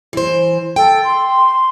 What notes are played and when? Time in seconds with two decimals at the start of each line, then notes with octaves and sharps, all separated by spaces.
0.13 E3 C5
0.76 A4 G5
1.04 C6